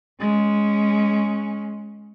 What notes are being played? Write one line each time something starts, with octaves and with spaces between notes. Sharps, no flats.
G#3 C#4